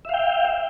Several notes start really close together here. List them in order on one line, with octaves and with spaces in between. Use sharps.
E5 F5 G5